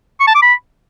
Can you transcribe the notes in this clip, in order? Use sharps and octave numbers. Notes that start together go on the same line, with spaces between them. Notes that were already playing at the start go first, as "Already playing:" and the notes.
C#6
A5
D6
B5